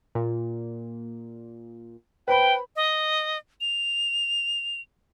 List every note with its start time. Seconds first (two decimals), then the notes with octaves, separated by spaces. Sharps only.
0.15 A#2
2.28 B4 C5 G5 B5
2.76 D#5
3.61 F7